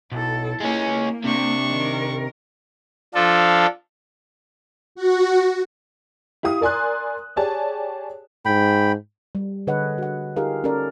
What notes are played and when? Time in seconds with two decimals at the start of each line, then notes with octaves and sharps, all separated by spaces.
0.12 B1 E4 A4
0.60 G#3 A#3 C#4 E4
0.91 A#3
1.25 C3 D4 C#6
1.67 D#3 A#4
3.14 F3 D4 F4 A4
4.95 F#4
6.43 E4 G4 F5 D#6
6.61 A#4 D5 G#5 C6 F#6
7.36 G4 G#4 C#5 D5 G#5 A5
8.45 G#2 G5 B5
9.35 G3
9.67 D3 G#4 B4 C#5 D#5 F#5
9.98 F#4 F#5
10.36 D#4 F4 G4 G#4 A#4 F5
10.64 C#4 A4 A#4 D5